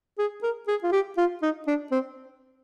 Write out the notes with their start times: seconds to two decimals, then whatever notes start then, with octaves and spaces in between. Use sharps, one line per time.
0.19 G#4
0.43 A#4
0.68 G#4
0.84 F4
0.92 G4
1.18 F4
1.42 D#4
1.67 D4
1.92 C4